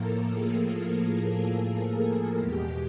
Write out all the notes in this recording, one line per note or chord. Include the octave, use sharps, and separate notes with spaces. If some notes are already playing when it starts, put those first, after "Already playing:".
Already playing: A2 F3 A#3 A4 A#4
G#4
E2 B2 G#3 G4